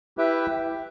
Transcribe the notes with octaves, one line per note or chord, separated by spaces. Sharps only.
E4 G4 B4 E5 G5